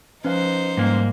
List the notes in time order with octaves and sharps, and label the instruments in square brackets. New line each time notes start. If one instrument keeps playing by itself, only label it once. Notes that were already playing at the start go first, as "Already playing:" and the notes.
[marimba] F3 [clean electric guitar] C#4 B4 F5 [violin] D#4 C5
[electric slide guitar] G#2 A#3 [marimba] G3